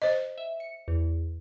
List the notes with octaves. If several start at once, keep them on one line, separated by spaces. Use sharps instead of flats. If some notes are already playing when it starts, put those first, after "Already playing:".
C5 D#5
E5
C#7
E2